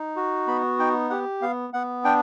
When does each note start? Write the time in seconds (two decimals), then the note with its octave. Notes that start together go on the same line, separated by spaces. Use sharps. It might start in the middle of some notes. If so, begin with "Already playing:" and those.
Already playing: D#4
0.16 F#4
0.47 B3 B5
0.79 D#4 G5
1.10 G4 F#5
1.42 B3 F5
1.73 B3 F#5
2.04 D4 G5